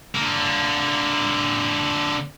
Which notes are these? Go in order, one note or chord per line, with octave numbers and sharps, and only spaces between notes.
D3 A#3